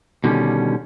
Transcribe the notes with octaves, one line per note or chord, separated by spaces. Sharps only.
B2 D3 D#3 G3 A#3 C#4